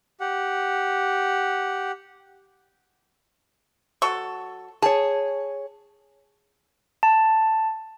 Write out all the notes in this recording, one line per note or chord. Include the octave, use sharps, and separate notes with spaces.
G4 F#5
F#3 A4 C#6
G#4 C#5 A5
A5